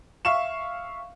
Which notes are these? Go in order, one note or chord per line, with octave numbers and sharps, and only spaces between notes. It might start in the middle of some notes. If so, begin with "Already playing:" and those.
E5 F5 C#6 E7